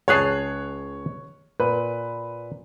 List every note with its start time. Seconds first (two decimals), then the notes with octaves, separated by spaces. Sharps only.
0.08 C#2 G#4 C#5 A5 F#6 C7
1.60 A#2 B4